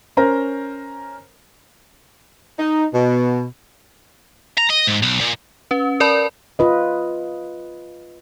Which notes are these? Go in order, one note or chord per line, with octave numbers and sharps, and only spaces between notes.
C#4 A#4 C5 A#5
D#4
B2
A#5
D#5
G#2
B1
A#2
C#4 B4
A#4 D5 A5 B5
F4 B4 D#5